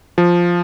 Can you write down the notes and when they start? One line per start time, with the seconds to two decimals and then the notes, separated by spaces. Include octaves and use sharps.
0.18 F3